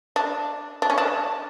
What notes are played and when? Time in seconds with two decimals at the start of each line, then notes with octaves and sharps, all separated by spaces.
0.16 D4
0.82 D4
0.90 C#4
0.98 D4